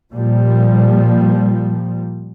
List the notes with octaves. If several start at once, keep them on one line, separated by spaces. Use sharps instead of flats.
A#2 F3 G3